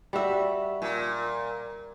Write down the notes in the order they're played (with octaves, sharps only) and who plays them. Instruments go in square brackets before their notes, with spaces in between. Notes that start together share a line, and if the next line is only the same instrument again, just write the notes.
[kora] G3 F#4 E5
[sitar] A#2